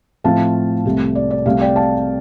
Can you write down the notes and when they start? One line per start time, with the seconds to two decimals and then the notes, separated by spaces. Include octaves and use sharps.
0.24 A2 F3 A3 C4 F5 A5
0.85 C2 C3 A3
1.15 D5
1.31 D5
1.46 C2 C3 A3 C4 F5
1.61 D5 G5
1.76 F5 A5